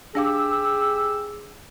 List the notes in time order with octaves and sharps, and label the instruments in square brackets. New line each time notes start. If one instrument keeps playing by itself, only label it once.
[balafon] D4 F5 D6 [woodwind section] G4 E6 [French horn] G#4